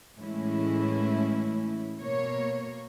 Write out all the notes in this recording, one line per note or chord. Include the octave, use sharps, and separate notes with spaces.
A2 E3 G#3 A3 C#4 E4
B2 A#3 C#5